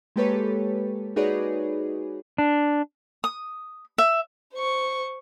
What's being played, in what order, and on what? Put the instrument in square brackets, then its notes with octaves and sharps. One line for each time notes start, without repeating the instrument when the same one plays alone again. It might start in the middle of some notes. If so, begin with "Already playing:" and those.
[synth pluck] G#3 A#3 G4 A4 B4 C#5
D#4 F#4 G#4 B4 C#5 D5
[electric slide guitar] D4
[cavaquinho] D#6
E5
[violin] C5 C#6